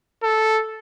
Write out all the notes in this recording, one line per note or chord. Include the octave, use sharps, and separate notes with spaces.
A4